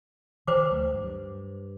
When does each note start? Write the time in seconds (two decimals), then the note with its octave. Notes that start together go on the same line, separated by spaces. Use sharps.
0.47 D#3 E3 B4 C5 D6
0.71 D2 F#3 A3
0.94 G2